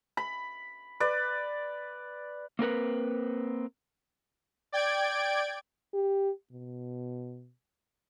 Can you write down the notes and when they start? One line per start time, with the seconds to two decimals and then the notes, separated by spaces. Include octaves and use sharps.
0.17 B5
1.00 B4 D5
2.59 A#3 C4 A#4 B4
4.72 D5 G5 G#6 D7
5.93 G4
6.52 B2